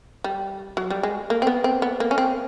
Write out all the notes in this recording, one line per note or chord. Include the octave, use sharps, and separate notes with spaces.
G3
F#3
G3
G#3
A#3
C4
B3
C4
B3
A#3
C#4
C4